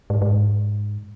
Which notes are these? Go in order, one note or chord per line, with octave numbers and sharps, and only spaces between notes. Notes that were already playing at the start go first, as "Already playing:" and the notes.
G#2
G#2